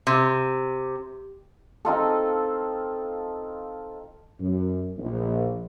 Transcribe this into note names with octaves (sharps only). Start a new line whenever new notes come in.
C3
C4 D#4 F4 A4
F#2
A#1